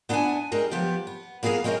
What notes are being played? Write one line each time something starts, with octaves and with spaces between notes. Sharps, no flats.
B3 D4 E4 F5 F#5 G#5
G3 G#3 A#4
F3 B3 G4
B3
A#3 B3 G#4 A#4 F5
G#3 C4 A#4 C#5 D#5